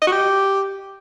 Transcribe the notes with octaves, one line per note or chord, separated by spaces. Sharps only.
D#5
F#4
G4